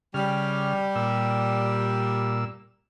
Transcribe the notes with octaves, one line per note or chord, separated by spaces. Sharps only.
C#3 G3 F6
A#2 E6